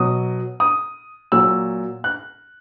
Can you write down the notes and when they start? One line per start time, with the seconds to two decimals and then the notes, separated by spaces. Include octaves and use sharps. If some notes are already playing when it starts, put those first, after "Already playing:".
Already playing: B2 F#3 D#6
0.60 D#6
1.32 A#2 F#3 E6
2.04 F#6